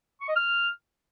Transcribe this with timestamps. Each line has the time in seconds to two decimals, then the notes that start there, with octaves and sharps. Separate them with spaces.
0.21 C#6
0.28 D#5
0.36 F6